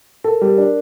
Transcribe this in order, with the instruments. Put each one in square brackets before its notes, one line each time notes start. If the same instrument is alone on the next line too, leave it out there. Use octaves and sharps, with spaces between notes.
[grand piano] A4 [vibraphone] A#4
[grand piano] G3
D4